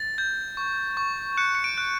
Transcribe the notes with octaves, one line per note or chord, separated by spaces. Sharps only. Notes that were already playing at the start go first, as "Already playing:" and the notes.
Already playing: A6
G6
C#6
C#6
F#6 C#7
C#7
D7
F#6